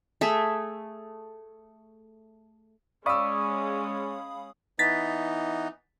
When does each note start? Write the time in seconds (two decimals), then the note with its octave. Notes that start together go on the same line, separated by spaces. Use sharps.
0.21 A3 G#4 E5
3.06 G#3 C#4 D5 F5 B5 C#6 D#6 E6
4.79 E3 B3 D#4 A6 B6